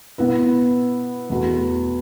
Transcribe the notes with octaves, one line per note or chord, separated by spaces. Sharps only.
B2 B3 E4 B4
E2 B2 A3 F#4 B4